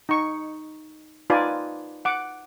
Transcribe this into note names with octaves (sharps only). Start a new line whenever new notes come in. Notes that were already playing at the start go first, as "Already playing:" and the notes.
D#4 C#6
D#4 F4 B4 D5 G#5
F#5 D6